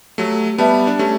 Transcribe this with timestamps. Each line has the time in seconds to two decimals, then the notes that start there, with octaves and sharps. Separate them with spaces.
0.18 F#3 A3 G4
0.58 G3 B3 B4 E5 A5
0.87 D4
0.99 A3 C#4 G4